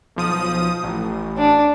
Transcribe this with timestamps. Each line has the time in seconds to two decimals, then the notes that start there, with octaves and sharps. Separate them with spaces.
0.16 B1 F3 D#6
0.84 A1
1.37 D4